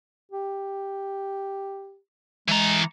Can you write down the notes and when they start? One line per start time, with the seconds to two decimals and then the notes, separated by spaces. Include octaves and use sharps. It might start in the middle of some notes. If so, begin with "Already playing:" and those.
0.32 G4
2.48 E3 G#3 A#5